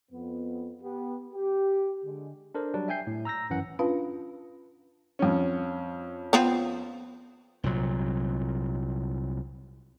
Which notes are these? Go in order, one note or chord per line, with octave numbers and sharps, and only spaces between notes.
F2 B3
B3 G4
G4
D3 G#3
D4 A4 A#4 C5
F#3 G3 D4
E5 G5 G#5 G6 C7
A2
A#5 E6 G6 A#6
G#1 F#2 E3 C#4 F#5
C#4 D4 F4 B4 F5 A5
F2 C#4
B3 C4 F4
C2 A#2 F#3